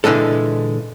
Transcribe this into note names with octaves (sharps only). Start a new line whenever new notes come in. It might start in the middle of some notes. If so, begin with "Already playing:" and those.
A#2 D3 E3 G#3 A4